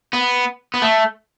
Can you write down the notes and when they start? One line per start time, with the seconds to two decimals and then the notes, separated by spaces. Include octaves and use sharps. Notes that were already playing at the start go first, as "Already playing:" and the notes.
0.13 B3
0.74 B3
0.82 A3